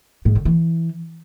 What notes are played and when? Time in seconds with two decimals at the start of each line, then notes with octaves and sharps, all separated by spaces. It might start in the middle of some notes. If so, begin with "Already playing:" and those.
0.25 G#2
0.35 D3
0.45 E3